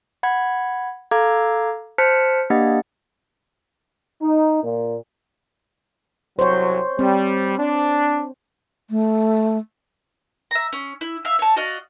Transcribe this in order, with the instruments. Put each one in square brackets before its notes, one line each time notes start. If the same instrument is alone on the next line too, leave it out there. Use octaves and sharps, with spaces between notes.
[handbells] F#5 B5 G#6
A4 F5 A#5 D6 G#6
C5 A5 F6 F#6 B6 C#7
A#3 D4 G4 D#5 F#5 A6
[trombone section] D#4
A#2
[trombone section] C2 F#3 [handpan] C5 C#5
[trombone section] G3 [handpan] C4
[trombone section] D4
[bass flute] A3
[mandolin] E5 A#5
C#4
E4
E5 F5 E6
C#5 A5
F#4 D5 D#5 F5